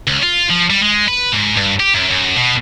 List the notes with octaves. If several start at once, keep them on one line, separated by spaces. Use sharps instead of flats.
C#2
F4
F3
G3
G#3
B4
G#2
G2
G4
F#2
F#2
B2